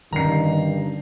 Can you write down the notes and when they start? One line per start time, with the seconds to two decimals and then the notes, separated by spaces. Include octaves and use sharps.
0.13 G2 D3 D#3 F3 C#4 A#5 C7